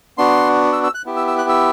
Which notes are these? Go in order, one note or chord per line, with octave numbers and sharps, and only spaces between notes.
B3 D4 F#4 C6
E6
E6
F#6
B3 E4 G4
E6
E6
F#6
E6